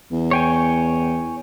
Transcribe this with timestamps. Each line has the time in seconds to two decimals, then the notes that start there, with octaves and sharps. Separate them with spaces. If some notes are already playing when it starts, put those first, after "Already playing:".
0.12 E2
0.31 C#5 G5 G#5